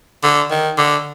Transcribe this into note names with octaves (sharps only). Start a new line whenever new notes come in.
D3
D#3
D3